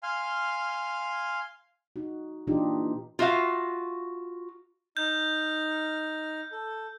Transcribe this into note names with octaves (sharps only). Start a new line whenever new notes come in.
F5 G#5 C6 F6
D#4 F#4
A#2 E3 D4 D#4 F4 G4
F4 F#4 E5 F5
D#4 F6 G6
A4